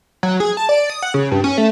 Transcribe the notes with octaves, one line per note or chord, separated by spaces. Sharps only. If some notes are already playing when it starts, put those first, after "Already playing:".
F#3
G#4
A5
D5
D#6
F#5
C#3
G2
C#4
A3